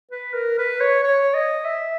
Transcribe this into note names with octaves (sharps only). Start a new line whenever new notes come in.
B4
A#4
B4
C#5
C#5
D#5
E5